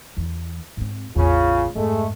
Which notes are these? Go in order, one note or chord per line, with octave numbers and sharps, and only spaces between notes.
E2 E3
G#2 C4
A1 E2 C#3 F4
F2 G#2 G#3 A3